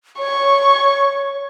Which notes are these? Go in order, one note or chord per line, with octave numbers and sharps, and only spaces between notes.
C#5 C#6